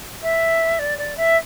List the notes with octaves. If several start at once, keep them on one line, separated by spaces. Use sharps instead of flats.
E5
D5
D5
E5